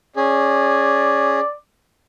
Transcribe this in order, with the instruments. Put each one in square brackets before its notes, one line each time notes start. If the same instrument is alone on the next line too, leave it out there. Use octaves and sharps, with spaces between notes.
[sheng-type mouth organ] C#4 G#4 [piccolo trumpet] D5